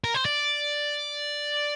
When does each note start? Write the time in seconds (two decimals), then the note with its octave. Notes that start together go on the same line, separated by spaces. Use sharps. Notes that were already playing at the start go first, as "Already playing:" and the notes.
0.04 A#4
0.14 C5
0.25 D5